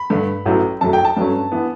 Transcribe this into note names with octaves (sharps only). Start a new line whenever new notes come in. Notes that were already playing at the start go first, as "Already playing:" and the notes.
Already playing: B5
G2 D3 A3
A1 A2 F#3
F#2 C#3 F#3 A3 A5
G5
A5
G2 F#3 A3 C#4
E3 B3